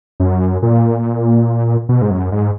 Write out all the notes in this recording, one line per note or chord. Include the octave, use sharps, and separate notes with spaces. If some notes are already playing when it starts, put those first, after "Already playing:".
F#2
A#2
B2
G#2
F#2
G#2